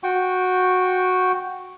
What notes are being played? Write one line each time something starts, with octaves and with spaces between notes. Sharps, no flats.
F#4 G5 C#6